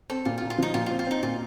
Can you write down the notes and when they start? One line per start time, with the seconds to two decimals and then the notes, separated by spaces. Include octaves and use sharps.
0.10 C4 A4
0.25 A#2 F4
0.38 F4
0.42 A#2
0.50 F4
0.58 F3 D#4
0.74 A#2 F4
0.86 F4
0.91 C4
0.99 F4
1.07 C4 D#4
1.23 A#2 F4